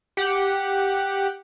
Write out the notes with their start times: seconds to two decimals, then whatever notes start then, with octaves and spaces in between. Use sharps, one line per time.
0.17 G4 F#5